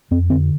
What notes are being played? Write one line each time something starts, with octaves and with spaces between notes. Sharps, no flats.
F2 C4
D3 C4